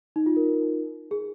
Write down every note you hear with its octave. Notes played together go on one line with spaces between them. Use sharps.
D#4
F4
A#4
G#4